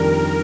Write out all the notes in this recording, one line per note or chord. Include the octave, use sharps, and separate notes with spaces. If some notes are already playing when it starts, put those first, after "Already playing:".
Already playing: F2 D#3 G3 D4 A#4